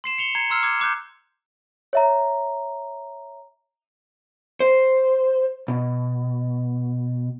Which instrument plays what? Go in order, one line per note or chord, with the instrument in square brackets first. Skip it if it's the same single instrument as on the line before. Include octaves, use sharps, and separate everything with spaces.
[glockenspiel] C6 C7 E7
C#7 F7 G7
A#5 G#6 C7 C#7
A#5 C6 E6 F6 C7 C#7
D6 G#6
A#5 D6 F#6 G6
[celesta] C#5 E5 A#5
[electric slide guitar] C5
B2